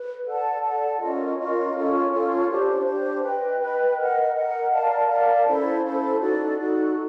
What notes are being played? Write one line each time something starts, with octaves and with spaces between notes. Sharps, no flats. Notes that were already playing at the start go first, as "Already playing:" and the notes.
Already playing: B4
A4 D5 F#5 A5
A4 D5 F#5 A5
C#4 F4 A#4 D#5
C#4 F4 A#4 D#5
C#4 F4 A4
C#4 F4 A4
D4 G4 C5
D4 G4 C5
B4 D#5 G5
B4 D#5 G5
A#4 D#5 F#5
A#4 D#5 F#5
A#4 D5 F5 A5
A#4 D5 F5 A5
C#4 E4 A4 C5
C#4 E4 A4 C5
D#4 F#4 A4 D5
D#4 F#4 A4 D5
A4